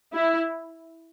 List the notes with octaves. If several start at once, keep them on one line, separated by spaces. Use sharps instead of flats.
E4